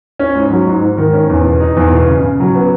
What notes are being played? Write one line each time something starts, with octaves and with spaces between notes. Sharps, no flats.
C#4
G#2
F#3
G#2
G#2
D#3
C#4
E2
B2
D#4
E2
B2
C#3
C#3
F#3
B3